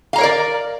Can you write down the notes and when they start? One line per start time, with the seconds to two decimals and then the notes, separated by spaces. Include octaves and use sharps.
0.13 F5
0.16 A#5
0.18 C#5
0.21 A#4
0.23 D5